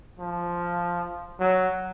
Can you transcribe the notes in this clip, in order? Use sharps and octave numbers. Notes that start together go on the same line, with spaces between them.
F3
F#3